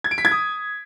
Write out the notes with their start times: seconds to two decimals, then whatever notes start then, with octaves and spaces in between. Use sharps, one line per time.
0.04 G#6
0.11 D7
0.18 B6
0.25 G#6
0.31 D#6